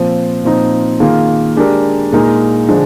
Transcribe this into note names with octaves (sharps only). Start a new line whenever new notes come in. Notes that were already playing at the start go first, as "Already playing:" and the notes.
Already playing: A#2 F3 C4
A#2 F3 C4 D#4
D#3 A#3 F4 G#4
G#3 D4 G4 A#4
A#2 G#3 D#4 A#4
D3 F3 G#3